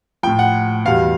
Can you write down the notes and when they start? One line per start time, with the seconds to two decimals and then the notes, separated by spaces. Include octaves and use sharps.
0.23 A2 F3 G5
0.39 F#5
0.85 E2 B2 G3 F5